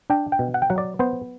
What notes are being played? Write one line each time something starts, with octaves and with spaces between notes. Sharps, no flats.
D4 G5
G5
B2
F#5
G5
F#3 F#5
D5
B3 C5